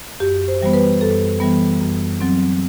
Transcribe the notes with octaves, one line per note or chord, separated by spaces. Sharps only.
F#2 G4
C5
E3 G3 B3 C5
B4
F#2 A4
E3 G3 B3
F#2
F#3 C4